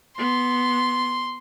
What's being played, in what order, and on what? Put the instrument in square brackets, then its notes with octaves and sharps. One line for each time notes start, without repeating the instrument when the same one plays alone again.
[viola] B3 [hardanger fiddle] C6